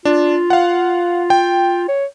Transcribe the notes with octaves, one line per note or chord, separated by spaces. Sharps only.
D4 F4
F5 F#5
G5
C#5